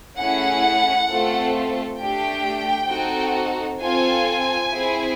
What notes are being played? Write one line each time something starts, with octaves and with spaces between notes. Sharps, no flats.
A3 C#4 E4 G#4 F#5
A3 C4 F4 A4
A3 D4 G4 G5
C4 D#4 F#4 A4
C4 F4 A4 G#5
C4 E4 G#4